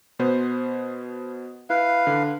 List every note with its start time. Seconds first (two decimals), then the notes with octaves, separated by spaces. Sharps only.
0.19 B2 B3 C5
1.70 E4 B4 F5
2.07 D3